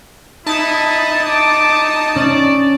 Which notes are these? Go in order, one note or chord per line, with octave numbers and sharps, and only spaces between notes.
D#4 E4 A5 D#6
D6
C#4 D5